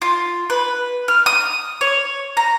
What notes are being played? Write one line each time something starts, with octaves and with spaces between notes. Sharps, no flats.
F4
B4
F6
D#6
C#5
A#5